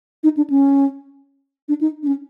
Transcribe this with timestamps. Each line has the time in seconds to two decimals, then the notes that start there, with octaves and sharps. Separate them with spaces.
0.24 D#4
0.37 D4
0.50 C#4
1.68 D4
1.81 D#4
2.03 D4
2.07 C#4